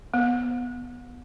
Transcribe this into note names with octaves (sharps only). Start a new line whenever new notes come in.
B3